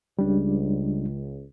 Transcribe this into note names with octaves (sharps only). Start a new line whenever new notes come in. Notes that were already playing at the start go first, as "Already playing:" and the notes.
C#2 G3 D4